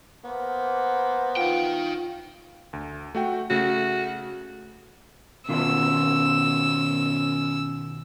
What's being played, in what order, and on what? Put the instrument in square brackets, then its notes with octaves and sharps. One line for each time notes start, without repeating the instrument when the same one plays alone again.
[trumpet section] A#3 C5 [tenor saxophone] B3
[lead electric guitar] D#4 G5 [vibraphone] F4 F5
[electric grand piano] D2
A3 F#4 G5
[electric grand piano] C#3 A3 [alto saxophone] F#4
[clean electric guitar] B2 D#3 F4 [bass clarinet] C#4 [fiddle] E6